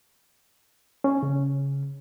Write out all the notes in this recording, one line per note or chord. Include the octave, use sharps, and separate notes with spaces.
C#4
C#3